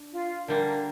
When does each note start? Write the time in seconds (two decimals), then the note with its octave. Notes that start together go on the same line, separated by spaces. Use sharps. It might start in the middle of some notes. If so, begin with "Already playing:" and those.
Already playing: D4
0.12 F4
0.48 D3 G3 A#3 A#4